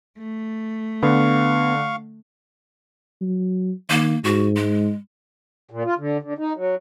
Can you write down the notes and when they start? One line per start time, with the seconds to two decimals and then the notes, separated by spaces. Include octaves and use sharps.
0.18 A3
1.03 D3 B3 F5 C#6
3.21 F#3
3.90 D#3 A#3
4.24 G#2 F#4
4.56 G#3
5.70 A#2
5.85 F4
5.98 D3
6.22 D3
6.38 D#4
6.56 F#3